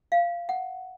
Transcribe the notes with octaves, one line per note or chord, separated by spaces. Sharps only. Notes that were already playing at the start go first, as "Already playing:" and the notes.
F5
F#5